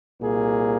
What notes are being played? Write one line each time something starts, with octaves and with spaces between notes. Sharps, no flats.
C2 A#2 A#3 G#4